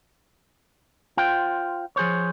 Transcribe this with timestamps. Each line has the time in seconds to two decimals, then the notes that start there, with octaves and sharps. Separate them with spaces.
1.17 F4 C5 G5
1.96 F3 G#4 C5 C#5